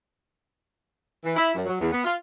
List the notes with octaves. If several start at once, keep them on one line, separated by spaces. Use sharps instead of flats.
E3
E4
F#2
F#3
E2
B3
F4